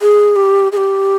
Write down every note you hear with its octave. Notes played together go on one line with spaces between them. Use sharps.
G#4
G4
G#4
G4